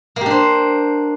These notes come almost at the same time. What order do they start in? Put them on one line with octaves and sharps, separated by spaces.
A#3 G4 D4 C5